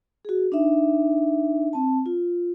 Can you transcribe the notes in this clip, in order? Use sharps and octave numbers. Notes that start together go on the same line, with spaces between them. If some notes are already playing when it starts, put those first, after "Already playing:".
F#4 G#4
D4 D#4 E5
C4 A5
F4